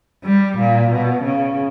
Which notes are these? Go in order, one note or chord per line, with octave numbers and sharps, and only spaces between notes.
G3
A#2
B2
C#3